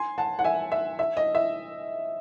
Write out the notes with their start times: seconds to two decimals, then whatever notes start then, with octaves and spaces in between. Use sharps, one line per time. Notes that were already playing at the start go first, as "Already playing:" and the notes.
Already playing: G#5 C6
0.18 F#5 A5
0.39 F#5
0.44 E5 G#5
0.72 E5
0.99 E5
1.17 D#5
1.35 E5